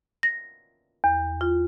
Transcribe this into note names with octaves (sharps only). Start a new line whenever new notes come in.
A#6
E2
F4